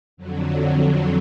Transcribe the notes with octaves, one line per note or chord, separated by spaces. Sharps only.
F2 D3 F#3